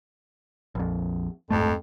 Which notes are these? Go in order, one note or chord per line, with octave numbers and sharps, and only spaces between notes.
A#1 F2
D1 F2 G#2 A3